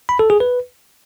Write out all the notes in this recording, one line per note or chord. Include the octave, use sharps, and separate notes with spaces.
B5
A4
G#4
B4